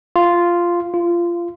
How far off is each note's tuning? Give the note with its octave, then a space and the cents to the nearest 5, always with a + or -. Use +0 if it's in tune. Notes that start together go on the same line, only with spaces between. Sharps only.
F4 -5
F4 -20